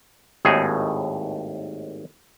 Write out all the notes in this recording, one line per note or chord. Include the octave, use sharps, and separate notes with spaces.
G#1 D#2 A2 D#4 G#4